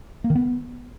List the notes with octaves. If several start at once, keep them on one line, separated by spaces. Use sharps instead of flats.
A#3
D#3
B3